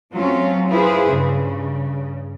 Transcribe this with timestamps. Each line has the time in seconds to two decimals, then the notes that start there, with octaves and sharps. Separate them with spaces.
0.14 F#3 A3 C4 C#4 F4
0.68 E4 F4 G#4 B4 C5
1.09 G2 C#3